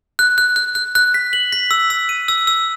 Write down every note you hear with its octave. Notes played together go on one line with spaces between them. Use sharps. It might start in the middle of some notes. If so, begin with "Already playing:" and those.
F#6
F#6
F#6
F#6
F#6
B6
F#7
B6
E6
E6
D#7
E6
E6